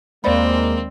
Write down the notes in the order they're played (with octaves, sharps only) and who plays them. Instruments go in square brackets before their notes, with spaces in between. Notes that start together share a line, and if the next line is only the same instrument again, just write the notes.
[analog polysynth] D#2 G#3 [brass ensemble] A#3 [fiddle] C4 [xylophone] C5 D5 B5